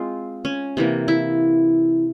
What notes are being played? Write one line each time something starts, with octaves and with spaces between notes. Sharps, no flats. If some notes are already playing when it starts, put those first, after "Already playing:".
Already playing: G#3 C4 F4
C#4
C3 E3 A#3
E4